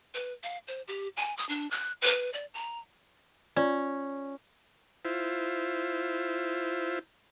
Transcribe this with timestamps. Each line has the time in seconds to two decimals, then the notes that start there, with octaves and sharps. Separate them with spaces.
0.14 B4
0.43 F5
0.68 C5
0.88 G4
1.17 G#5
1.37 D#6
1.49 D4
1.71 F#6
2.02 B4
2.33 D5
2.54 A#5
3.56 C#4 F4 D5 A#5
5.05 E4 F4 C5